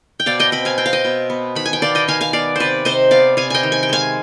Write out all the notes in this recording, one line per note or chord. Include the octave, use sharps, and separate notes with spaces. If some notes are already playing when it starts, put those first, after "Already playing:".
G5
B2 D5 F5
D#5 G5
C4 G5 B5
F5 G#5
C4 G5
F5
D#5 G5
B2
B3
D#3 B5
G#5
G5
D#3 D5 F5
D#5 G5
D#3 F5 G#5
F5 G#5
B3 D5 F5
C3 B4 C5 D5
C3 C5 D#5
B3 D5 F5
C3 F5 G#5
D#5 G5 G#5
D#3
G#5
G5
G#3 F5 G#5